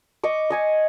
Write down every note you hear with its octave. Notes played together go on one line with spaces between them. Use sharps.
D#5 C#6 D6
D#5 G#5 C#6